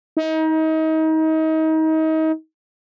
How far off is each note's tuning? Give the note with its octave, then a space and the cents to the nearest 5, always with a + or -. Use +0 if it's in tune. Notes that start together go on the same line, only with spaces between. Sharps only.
D#4 +30